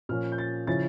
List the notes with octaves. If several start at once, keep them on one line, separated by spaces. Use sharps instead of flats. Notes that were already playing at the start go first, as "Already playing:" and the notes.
A#2 F3 C#4 F6
G6
A6
C#3 F3 C#4 E4 A6